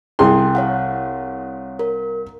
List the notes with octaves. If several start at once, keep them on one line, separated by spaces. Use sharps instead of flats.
C2 E4 G#4 G5 C6
C#5 F5 F#5
A#4